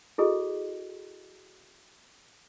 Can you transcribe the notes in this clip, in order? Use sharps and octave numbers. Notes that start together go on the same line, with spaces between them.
E4 F#4 G#4 A4 D#5